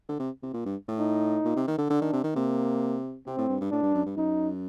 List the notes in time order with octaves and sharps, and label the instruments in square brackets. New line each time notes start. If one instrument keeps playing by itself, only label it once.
[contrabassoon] D3
C3
C3
A#2
G2
A2
[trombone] D#4
[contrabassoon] A#2
C3
D#3
D3
[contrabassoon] D3 [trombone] D4
[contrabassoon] D#3
C3
D#3
[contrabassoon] C3 [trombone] A#3
[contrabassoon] C3 [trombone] C4
[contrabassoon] A2
G2
G2
[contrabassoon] A2 [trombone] D4
[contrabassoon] G2
F#2
G2
[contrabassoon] F#2 [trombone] D#4